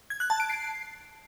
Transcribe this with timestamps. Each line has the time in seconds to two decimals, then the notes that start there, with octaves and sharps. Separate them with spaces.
0.10 G#6
0.20 F#6
0.30 A5
0.40 D7
0.50 C7